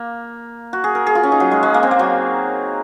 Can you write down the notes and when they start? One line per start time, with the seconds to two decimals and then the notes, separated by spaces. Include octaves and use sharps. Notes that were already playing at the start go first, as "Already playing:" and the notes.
Already playing: A#3
0.73 F#4
0.84 G#4
0.95 A#4
1.07 G#4
1.15 F4
1.23 C#4
1.32 D#4
1.40 F#3
1.51 G#3
1.63 G#3
1.74 A#3
1.83 C4
1.91 A#3
1.99 F#3